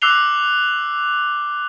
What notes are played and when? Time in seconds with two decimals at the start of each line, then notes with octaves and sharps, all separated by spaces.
0.02 D6 E6 F#6 C7 F7 G7